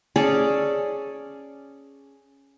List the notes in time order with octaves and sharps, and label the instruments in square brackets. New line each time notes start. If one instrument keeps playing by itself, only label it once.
[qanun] C#4 G#4 A4 D5